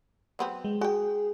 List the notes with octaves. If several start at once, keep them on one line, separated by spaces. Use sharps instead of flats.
F#3 B3 C4
G#3
F#4 G#4 G5